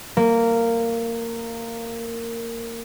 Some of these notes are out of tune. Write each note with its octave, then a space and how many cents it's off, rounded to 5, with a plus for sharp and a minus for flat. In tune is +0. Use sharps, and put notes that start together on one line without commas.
A#3 -15